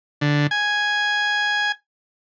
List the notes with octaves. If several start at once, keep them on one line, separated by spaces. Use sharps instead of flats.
D3
G#5